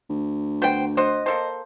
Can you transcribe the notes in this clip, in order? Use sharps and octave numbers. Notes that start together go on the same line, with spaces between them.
D2
B3 C5 G5
C5 D#5 F#5
A#3 A4 C5